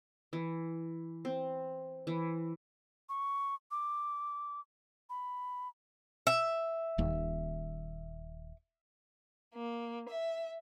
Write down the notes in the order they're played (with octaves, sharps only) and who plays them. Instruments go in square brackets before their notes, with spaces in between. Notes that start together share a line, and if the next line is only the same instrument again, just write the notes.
[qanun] E3
C4
E3
[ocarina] C#6
D6
B5
[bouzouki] E5
[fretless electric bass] D#1 D#2
[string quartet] A#3
E5